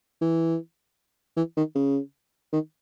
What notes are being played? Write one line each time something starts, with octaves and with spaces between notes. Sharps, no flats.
E3
E3
D#3
C#3
D#3